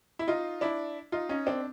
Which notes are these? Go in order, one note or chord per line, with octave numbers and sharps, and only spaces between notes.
E4
D#4 F4
D4 E4
D#4 F4
C#4 D#4
C4 D4